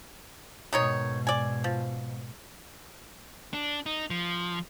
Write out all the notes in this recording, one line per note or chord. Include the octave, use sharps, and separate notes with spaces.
G#2 B2 D#3 D#4 C#5
D5 G#5
F3
D4
D#4
F3